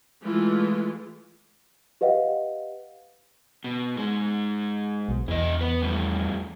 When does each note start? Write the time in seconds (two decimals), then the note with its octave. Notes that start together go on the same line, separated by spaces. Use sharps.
0.22 E3 G#3 A3 F4
2.01 G4 B4 D#5 F5 F#5
3.64 B2
3.96 G#2 G#3
5.09 B1
5.28 E2 E3 D#5
5.61 B3 B4
5.82 F2 A2 G3